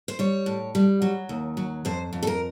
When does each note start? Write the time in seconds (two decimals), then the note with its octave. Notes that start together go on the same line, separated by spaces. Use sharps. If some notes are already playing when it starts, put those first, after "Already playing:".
0.08 C5
0.19 G3 C#5
0.46 A2
0.75 G3
1.02 F#3
1.29 D#2
1.57 F#3
1.85 F2 C5
2.13 F2
2.23 A4
2.27 A#4